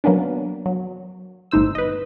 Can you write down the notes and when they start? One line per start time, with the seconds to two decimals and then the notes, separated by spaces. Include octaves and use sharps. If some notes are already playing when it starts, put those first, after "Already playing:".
0.04 F#3 A#3 B3 C#4 D4
0.66 F#3
1.51 G1 A2 D#4 C5 E6
1.75 B4 D#5